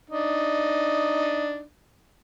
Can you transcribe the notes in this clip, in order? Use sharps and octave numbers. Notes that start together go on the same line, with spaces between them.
D4 D#4